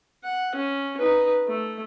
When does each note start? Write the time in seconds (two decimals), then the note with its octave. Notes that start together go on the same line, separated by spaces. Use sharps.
0.24 F#5
0.55 C#4
0.99 D#4 B4
1.48 A3